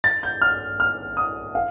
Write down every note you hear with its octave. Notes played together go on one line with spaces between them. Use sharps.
A6
G6
F6
F6
D#6
F5